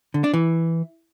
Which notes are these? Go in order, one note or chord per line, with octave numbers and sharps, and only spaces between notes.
D3
D4
E3